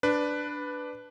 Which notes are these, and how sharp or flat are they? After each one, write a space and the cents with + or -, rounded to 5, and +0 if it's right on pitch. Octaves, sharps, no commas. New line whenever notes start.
D4 +0 B4 +5